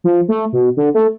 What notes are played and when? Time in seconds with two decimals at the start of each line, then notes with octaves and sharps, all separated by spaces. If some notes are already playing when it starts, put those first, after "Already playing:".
0.04 F3
0.28 A3
0.53 B2
0.77 D3
0.94 A3